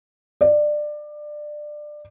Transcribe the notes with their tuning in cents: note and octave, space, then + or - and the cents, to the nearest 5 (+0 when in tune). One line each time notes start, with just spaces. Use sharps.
D5 +20